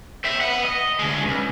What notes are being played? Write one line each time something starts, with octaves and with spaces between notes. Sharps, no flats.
E5 G5
B3 F#5
D#5
D2 G#3
C#2 G2